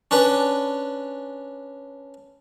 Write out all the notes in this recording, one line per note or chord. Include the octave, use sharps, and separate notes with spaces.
C#4 D4 B4